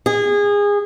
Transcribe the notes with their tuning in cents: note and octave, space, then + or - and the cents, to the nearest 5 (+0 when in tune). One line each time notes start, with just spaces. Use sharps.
G#4 -25